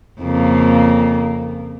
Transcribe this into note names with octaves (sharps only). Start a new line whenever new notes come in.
F2 C#3 A#3